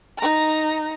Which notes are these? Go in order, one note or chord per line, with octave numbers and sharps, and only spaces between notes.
D#4 A#5